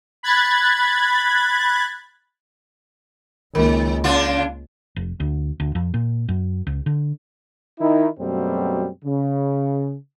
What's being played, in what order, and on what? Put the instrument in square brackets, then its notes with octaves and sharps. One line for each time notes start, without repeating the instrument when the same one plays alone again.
[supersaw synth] B5 F#6 G#6 A6
[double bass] C#2 [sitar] D#3 [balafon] A#3 A#4
[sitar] C#3 D4 F4
[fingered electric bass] F1
D2
D2
F2
A#2
F#2
C#2
D3
[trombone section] D#3 D#4 E4
F#2 B2 F#3 G3 A3 C4
C#3